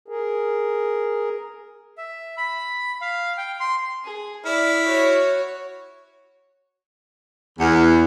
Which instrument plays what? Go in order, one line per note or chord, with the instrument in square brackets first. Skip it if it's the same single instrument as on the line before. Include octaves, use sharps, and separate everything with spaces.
[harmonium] G#4 A#4
[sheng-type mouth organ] E5
B5
F5
G5
C6
[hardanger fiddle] G#4
[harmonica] E4 F6 [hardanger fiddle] D5
[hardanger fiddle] F#4 C#5
[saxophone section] E2